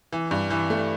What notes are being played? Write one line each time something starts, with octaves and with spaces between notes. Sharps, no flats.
E3
G2
E3
A3